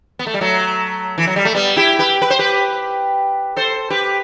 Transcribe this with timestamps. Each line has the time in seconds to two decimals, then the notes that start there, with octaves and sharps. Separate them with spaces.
0.19 B3
0.27 A3
0.34 G3
0.41 F#3 A3
1.18 E3
1.27 F#3
1.36 G3
1.45 A3
1.55 G3 B3
1.76 E4 G4
1.99 G4 B4
2.22 B4
2.30 C5
2.39 G4 B4
3.56 A4 C5
3.90 G4 B4